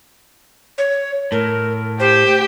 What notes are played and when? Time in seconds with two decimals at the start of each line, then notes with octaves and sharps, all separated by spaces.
0.78 C#5
1.32 A2 A#4
2.00 G4 C5 G5